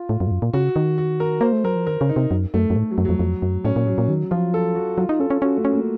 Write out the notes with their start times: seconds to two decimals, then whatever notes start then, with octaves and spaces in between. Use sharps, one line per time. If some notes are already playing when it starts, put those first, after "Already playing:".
Already playing: F4
0.09 A2
0.20 F#2
0.27 A2
0.31 F#2
0.42 A#2
0.53 C#3 F#4
0.76 D#3
0.98 F#4
1.20 A#4
1.41 A#3 C5
1.53 A3
1.64 F#3 A#4
1.76 F3
1.87 D#3 A#4
2.01 C#3
2.09 D#4
2.16 C3
2.31 F#2
2.54 F#2 A3
2.70 F#2
2.76 A2 A3
2.91 F#3
2.98 F#2
3.05 F2 F#3
3.19 F2
3.42 F#2
3.65 A2 C#4
3.76 A#2
3.86 A2 F#3
3.98 A#2
4.08 D#3 F#3
4.31 F3 F4
4.54 A4
4.75 F#4
4.98 F#3 F4
5.09 D#4
5.20 C#4 A4
5.30 C#4
5.41 C#4 F#4
5.57 A3
5.65 C#4
5.72 A#3